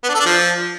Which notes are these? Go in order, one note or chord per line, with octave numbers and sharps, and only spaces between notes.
B3
D4
A4
D4
F3